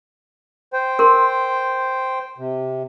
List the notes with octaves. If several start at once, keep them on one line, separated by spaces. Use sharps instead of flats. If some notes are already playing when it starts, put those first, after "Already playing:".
C5 G5
A#4 C6
C3